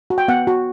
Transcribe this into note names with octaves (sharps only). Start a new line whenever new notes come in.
F#4
G5
B3 F#5
F#4